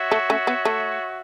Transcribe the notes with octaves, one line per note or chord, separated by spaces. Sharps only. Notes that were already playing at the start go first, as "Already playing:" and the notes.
Already playing: F#4 C#5 E5
A3
A3 C#4
B3
A3